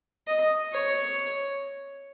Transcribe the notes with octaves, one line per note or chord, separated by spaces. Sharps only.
D#5
C#5